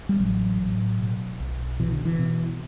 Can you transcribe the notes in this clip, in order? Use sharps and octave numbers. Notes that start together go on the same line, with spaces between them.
G3
A1 F#3
A2
B2
B1
B2 E3
D3
E3
B2